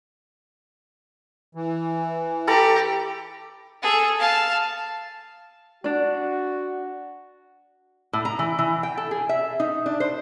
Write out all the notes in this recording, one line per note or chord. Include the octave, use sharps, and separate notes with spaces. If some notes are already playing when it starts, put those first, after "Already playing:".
E3
G4 A4 A#5 B5
G#4 A4
F5 A5
D4 F#4 D5
A2
A#5
E3
E3
G5
A4
G#4
E5
D#4
D4
C5